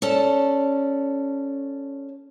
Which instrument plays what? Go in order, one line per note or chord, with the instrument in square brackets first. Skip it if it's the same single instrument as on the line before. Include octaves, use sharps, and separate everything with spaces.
[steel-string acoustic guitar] C#4 A4 D5 A5